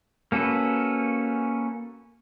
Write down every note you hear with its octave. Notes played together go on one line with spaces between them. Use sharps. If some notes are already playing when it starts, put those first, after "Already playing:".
A#3 C#4 F#4 A4 B4